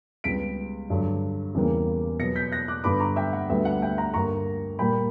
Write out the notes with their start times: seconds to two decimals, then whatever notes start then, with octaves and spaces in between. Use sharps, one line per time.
0.24 C#2 C#3 G3 B3 B6 D7
0.90 G2 D3 F#3
1.55 E2 C#3 E3 G3 A#3
2.19 B2 F#3 B3 A#6 C#7
2.36 G6 B6
2.52 F#6 A#6
2.68 D6 F#6
2.84 G2 D3 G3 B3 B5 D6
3.00 A#5 C#6
3.16 E5 G5
3.33 F#5
3.49 D2 D3 G3 B3 E5
3.65 F#5
3.82 E5 G5
3.98 F#5 A#5
4.14 G2 D3 A#3 A#5 C#6
4.79 A#2 G3 A#3 G5 B5